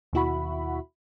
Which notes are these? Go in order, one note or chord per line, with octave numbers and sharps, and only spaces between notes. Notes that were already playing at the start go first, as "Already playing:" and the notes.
D#2 B2 E4 F#4 B5